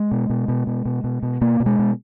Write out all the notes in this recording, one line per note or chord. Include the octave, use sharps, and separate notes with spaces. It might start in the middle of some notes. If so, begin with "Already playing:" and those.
Already playing: G#3
B2
B2
B2
B2
B2
B2
B2
B2 A#3
B2
G#3
B2